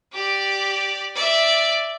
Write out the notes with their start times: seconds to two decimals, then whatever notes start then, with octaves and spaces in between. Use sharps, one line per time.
0.13 G4 D5
1.15 D5 E5